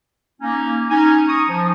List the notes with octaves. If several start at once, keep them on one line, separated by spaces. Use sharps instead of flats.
A#3 C#4 D#4
C#4 D#4 G#5
A#5 C#6 D#6
F3